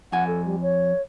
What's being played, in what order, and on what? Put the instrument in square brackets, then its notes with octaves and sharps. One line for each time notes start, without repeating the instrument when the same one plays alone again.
[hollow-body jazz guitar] F2 G#5 [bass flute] F#5
[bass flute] A4
G3
C#5